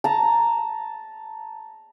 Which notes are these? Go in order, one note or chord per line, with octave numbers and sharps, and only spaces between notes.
A5 A#5